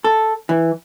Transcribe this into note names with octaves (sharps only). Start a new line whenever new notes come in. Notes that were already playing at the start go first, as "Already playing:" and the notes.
A4
E3